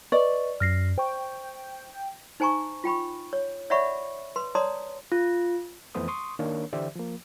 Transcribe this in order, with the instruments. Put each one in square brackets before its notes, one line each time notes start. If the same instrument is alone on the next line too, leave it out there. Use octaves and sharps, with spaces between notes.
[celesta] B4 D#5 C#6 [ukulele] D5
[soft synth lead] F#2 [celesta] F6 A#6 C7
[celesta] C5 C#6 [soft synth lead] G5
[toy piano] D#4 C5 G#5 A#5 C#6
F4 G5 B5 C#6
C#5
C#5 D5 E5 F#5 B5 C#6
B4 C6
C#5 D5 A5 A#5 C6 D#6
[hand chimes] F4
[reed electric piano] F2 E3 A3 B3 C5 D#6
C6 C#6 D#6
D#3 A#3 D4 A#4 C#5
D3 E3 G4 C5 D5 E5
F3 A#3